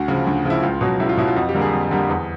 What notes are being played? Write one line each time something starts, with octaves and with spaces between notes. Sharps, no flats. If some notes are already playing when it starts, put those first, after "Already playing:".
Already playing: D2 F#4
C#3 F3
D2
C#3 F3 E4
C#2 F4
B2 F#3
C#2 E4
F4
B2 F#3 E4
F4
F2 F#4
G4
D3 G3 A#3
G#4
F2
D3 G3 A#3
E2